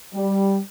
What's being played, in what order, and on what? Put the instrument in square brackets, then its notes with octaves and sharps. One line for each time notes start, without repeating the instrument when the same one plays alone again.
[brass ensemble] G3